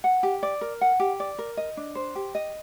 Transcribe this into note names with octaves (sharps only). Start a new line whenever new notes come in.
F#5
G4
D5
A#4
F#5
G4
D5
A#4
D#5
D4
C5
G4
D#5